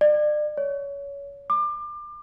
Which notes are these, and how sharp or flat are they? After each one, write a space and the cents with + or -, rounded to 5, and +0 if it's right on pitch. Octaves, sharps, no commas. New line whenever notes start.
D5 +35
C#5 +25
D6 +30